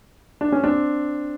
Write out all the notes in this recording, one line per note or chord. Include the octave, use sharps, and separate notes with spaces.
D4
C#4
C4 D4